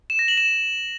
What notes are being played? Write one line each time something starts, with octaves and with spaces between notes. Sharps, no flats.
E7
A#6
F#7
E7